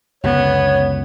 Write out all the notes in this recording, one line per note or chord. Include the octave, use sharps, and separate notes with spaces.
C#2 F#2 D3 B3 C#5